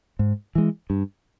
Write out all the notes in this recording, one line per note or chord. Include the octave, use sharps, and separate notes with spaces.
G#2
E3 G#3
G2